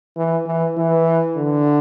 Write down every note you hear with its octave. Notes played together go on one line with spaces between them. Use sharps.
E3
E3
E3
D3